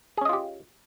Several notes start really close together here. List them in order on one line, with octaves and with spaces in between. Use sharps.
G#4 C#4 D#5 F4 G4